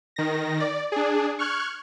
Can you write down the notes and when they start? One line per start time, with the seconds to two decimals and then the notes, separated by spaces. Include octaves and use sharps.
0.16 D#3 A#6
0.60 D5
0.92 D4 G#4
1.39 C#6 F6 F#6 G#6